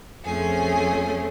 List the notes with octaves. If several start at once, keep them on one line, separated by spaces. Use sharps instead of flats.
F2 F3 A3 C#4 G#4